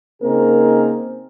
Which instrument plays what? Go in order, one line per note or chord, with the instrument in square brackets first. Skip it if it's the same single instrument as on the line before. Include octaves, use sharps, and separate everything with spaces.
[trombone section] C#3 A#3 C4 D#4 G#4 A#4